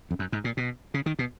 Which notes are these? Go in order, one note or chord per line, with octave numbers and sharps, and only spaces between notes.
F2
F#2
G#2
A#2
B2
C#3
D#3
B2